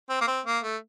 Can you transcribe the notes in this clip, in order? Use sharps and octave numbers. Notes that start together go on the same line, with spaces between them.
C4
A#3
C4
A#3
A3